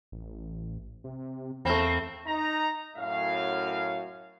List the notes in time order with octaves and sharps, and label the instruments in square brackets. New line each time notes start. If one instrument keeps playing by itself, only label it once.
[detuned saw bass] A1
C3
[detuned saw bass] E2 [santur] A3 B5 [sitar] A#3 C4
[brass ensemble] D#4 A#5
F#2 A2 F5